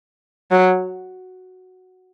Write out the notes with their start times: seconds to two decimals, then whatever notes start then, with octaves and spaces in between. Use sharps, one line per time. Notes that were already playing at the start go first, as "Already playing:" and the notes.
0.51 F#3